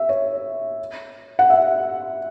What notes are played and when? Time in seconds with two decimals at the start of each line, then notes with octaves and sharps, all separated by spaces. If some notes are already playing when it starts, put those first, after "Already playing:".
Already playing: E5
0.09 C#5
1.39 F#5
1.50 E5